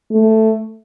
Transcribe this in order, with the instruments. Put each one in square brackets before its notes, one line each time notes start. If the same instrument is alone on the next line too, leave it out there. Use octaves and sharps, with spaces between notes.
[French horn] A3